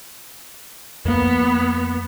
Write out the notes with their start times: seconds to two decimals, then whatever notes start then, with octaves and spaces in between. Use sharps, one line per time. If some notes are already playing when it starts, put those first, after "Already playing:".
1.05 F2 A#3 B3